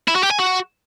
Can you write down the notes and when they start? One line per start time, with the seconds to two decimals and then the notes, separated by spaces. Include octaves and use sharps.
0.08 E4
0.16 F#4
0.23 G4
0.31 G#5
0.39 F#4